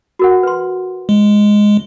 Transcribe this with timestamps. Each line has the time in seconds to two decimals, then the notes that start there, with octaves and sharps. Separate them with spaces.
0.19 F#4 A#4 F#5
0.43 B4 C6
1.09 G#3